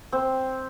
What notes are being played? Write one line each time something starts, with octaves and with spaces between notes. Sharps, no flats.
C4